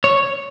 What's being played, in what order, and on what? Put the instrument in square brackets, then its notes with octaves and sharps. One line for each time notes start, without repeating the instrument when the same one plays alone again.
[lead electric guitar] C#5